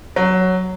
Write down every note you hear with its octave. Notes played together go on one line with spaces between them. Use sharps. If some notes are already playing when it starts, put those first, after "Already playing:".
F#3